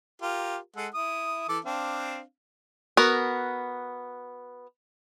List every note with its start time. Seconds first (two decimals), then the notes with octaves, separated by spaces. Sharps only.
0.22 F4 G4 A#4
0.76 G#3 A4 F#5
0.94 E4 D#6
1.49 E3 A4 D6
1.65 C4 D4 F5
2.97 B3 F#4 A#4